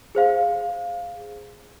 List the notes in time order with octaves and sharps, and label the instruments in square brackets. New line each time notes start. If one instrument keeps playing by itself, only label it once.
[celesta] G#4 C5 F5